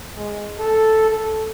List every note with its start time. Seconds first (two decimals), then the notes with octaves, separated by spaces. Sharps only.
0.16 G#3
0.59 A4
1.10 A4